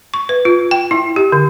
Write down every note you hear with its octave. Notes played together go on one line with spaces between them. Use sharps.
C#6
B4
F4
G5
E4
G4
D3